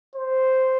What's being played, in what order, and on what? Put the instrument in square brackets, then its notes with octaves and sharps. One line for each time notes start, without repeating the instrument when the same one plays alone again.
[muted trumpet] C5